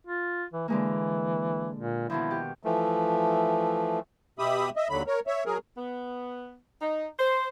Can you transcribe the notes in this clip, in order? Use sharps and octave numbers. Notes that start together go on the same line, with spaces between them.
F4
E3
D3 E3 G#3 A#3
A#2
B2 D#3 F3 E4
G4
E3 F3 A3
B2 G4 E5 B5 D#6
D#5 E5
D#2 D3 F#3 B5
A#4 C#5
C#5 E5
F#3 G#4 A#4
B3
D#4
C5